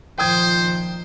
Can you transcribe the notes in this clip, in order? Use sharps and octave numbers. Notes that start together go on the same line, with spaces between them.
A#2 D#3 F3 C5 G5 D#6 G#6